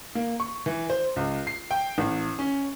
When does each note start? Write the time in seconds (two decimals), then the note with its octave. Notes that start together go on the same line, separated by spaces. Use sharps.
0.15 A#3
0.40 C#6
0.66 E3
0.90 C5
1.16 C#2
1.47 C7
1.71 G5
1.98 A1
2.39 C#4